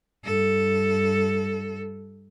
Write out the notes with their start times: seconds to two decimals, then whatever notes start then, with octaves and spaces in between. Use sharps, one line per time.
0.25 G2 A4